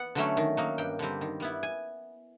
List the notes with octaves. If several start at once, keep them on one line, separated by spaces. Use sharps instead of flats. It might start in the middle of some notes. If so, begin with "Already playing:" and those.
Already playing: B3 F#5
D3 F#3 A3 C#4
D#3
F#3 A#3 D#4
G2 G5
D3 G3 C4
D#3
G3 B3 E4
G#5